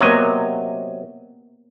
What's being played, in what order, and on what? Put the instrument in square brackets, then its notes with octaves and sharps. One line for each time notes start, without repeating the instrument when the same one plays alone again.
[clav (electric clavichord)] C3 F#3 D#5 [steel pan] A#3 B3 C#5